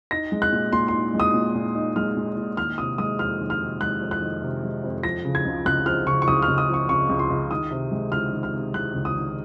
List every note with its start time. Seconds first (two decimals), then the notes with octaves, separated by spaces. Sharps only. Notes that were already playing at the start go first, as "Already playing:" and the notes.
0.11 D#4 A#6
0.32 G#3
0.42 F#6
0.52 A#2
0.73 A#2 C6
0.88 D#4 C6
1.14 G#3
1.20 D#6
1.34 A#2
1.55 A#2
1.75 D#4
1.96 G#3 F6
2.17 A#2
2.37 A#2
2.57 D#3 F6
2.78 C3 D#6
2.98 G#3 D#6
3.19 F2 F6
3.40 D#3
3.50 F6
3.60 C3
3.81 G#3 F#6
4.01 F2
4.11 F#6
4.22 D#3
4.42 C3
4.63 G#3
4.84 F2
5.03 F3 A#6
5.25 C#3
5.35 G#6
5.45 C#2
5.66 C#2 F#6
5.86 F3 F6
6.07 C#3 C#6
6.22 C#6
6.28 C#2 D#6
6.42 F6
6.48 C#2
6.58 D#6
6.68 F3
6.74 C#6
6.89 C#3 C#6
7.09 C#2
7.19 C6
7.30 C#2
7.51 D#3 D#6
7.71 C3
7.92 G#3
8.12 C#2 F6
8.32 D#3
8.43 F6
8.54 C3
8.74 G#3 F#6
8.94 C#2
9.05 D#6
9.15 D#3